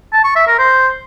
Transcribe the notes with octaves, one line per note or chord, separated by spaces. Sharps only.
A5
C#6
E5
A#4
C5